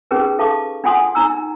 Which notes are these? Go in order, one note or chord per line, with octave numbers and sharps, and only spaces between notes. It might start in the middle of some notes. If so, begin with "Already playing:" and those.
C#4 D#4 G4 G#4 A#4 B4
A4 F5 A5 C#6 D6
D4 F4 F#5 G#5 C6 D#6
D4 D#4 A#5 E6